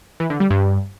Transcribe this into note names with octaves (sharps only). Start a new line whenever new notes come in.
E3
D3
G3
G2